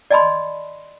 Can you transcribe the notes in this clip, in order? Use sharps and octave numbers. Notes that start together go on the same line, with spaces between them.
D5 D#5 G#5 A5 B5 C6